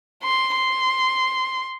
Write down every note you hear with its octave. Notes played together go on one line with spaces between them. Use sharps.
C6
C6